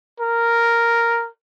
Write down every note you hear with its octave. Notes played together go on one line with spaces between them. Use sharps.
A#4